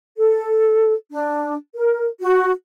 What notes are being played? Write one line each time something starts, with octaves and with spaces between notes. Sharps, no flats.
A4
D4
A#4
F#4